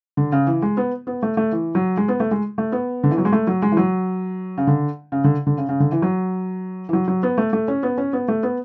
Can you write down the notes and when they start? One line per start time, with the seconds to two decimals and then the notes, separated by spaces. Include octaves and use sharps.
0.17 D3
0.32 C#3
0.47 E3
0.62 G#3
0.77 B3
1.07 B3
1.23 A3
1.37 A3
1.52 E3
1.75 F#3
1.97 G#3
2.08 B3
2.20 A3
2.31 G#3
2.58 A3
2.72 B3
3.03 D3
3.11 E3
3.18 F#3
3.25 G#3
3.32 A3
3.47 F#3
3.62 G#3
3.72 E3
3.77 F#3
4.58 C#3
4.67 D3
5.12 C#3
5.24 D3
5.47 D3
5.58 C#3
5.69 C#3
5.80 D3
5.92 E3
6.02 F#3
6.89 E3
6.93 F#3
7.08 F#3
7.23 B3
7.38 A3
7.53 A3
7.68 C#4
7.83 B3
7.98 C#4
8.13 B3
8.28 A3
8.43 B3